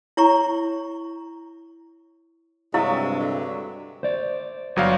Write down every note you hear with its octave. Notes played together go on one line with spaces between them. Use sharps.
E4 C#5 A#5 C#6
G2 C3 F#3 G#3 E4 E5 F5 C#6
D3
C5 D5
G1 F#3 F5